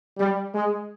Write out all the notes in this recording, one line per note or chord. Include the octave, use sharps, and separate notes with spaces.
G3
G#3